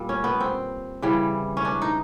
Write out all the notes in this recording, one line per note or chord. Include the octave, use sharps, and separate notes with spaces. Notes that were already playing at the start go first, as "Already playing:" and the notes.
Already playing: A#2 G3
C#4
B3
C4
C#3 E3 G3
C#4
D4
D#4